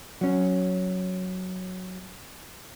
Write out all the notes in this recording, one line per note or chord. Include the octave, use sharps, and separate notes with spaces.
F#3 C#4